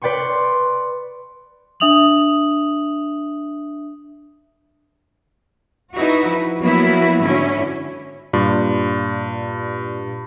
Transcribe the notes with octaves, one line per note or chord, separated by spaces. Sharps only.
B4 D5 G5 C6 C#6
D4 E5 D#6 F7 F#7
D#4 E4 F#4 B4
F3
F3 F#3 A#3 B3 E4 F#4
G#2 D3 C#4 E4 F#4
G2 A#2 F4 D5